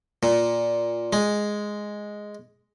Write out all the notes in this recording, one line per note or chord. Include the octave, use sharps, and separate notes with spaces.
A#2
G#3